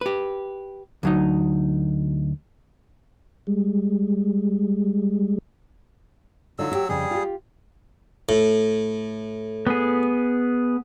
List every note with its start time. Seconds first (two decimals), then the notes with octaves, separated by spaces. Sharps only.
0.01 G4 B4
1.03 D2 F#3 D#4
3.47 G3 G#3
6.59 D3 F#3 D#4 F4 E6
6.72 E4 G4
6.89 F2 C#3 G3 G#4
7.11 F4 G4
8.29 A2
9.67 B3 G#4